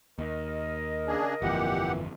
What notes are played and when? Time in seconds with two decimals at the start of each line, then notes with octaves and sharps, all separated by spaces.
0.18 D#2 A#4 D#5
1.07 C#3 D4 G#4
1.42 G1 F2 A#2 E3 G4 F#5